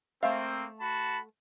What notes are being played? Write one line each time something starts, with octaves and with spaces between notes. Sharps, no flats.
A3 A#3 C4 E5 F5
F#4 A5 B5